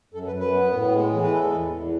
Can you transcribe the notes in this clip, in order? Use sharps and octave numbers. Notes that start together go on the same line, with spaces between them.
F#2 A4
B4
F#2
B4
B3
A2
G#3
E3
B4
E2 A4
E2
E2